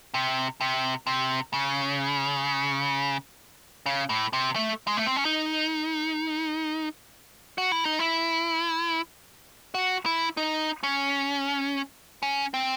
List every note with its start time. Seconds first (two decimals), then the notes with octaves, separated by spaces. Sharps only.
0.14 C3
0.61 C3
1.07 C3
1.54 C#3
3.86 C#3
4.09 A2
4.33 C3
4.56 A3
4.87 G#3
4.97 A3
5.07 C4
5.16 C#4
5.25 D#4
7.58 F#4
7.72 E4
7.85 D#4
7.99 E4
9.74 F#4
10.06 E4
10.37 D#4
10.83 C#4
12.23 C#4
12.54 C4